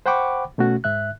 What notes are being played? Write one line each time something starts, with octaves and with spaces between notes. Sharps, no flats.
C5 F#5 G5 B5 C#6 D6
B2 A3 C#4 F#4
G#2 E5 F#6